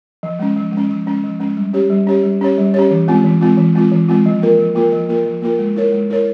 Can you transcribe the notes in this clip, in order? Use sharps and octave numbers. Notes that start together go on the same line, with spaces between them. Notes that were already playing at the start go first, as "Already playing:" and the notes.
F3
G#3 C#4
F3
G#3 C#4
F3
G#3 C#4
F3
G#3 C#4
G3
C#4 G4 C#5
G3
C#4 G4 C#5
G3
C#4 G4 C#5
G3
C#4 G4 C#5
E3
G#3 C4 F4
E3
G#3 C4 F4
E3
G#3 C4 F4
E3
G#3 C4 F4
F3
A#3 F4 A#4
F3
A#3 F4 A#4
F3
A#3 F4 A#4
F3
A#3 F4 A#4
G#3
E4 A#4 C#5
G#3
E4 A#4 C#5